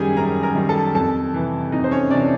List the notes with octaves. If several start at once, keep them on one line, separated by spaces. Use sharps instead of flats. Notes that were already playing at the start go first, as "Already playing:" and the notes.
Already playing: F#2 D#3 G3 G4 G#4 G#5
F#2 A#4 A#5
A#4 A#5
D#3 G3
A4 A5
F2 A4 A5
C3 E3
F2 D#4 D#5
C5
C#4 C#5
C3 E3 D4 D5